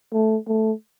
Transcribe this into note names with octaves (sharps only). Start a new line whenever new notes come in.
A3
A3